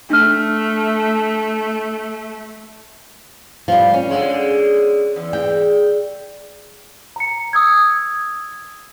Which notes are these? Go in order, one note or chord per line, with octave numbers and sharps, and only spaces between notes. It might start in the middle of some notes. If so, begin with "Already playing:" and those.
A3 D4 F6
F3 G3
C#4
D3 G#3
E2
G5
A#5 C#7
D#6 E6 G#6